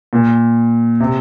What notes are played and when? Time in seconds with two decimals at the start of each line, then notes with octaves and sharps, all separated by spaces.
0.13 A#2
1.00 C3